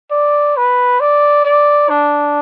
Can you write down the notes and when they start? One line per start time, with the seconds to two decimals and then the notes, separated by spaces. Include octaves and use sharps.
0.11 D5
0.57 B4
1.00 D5
1.45 D5
1.90 D4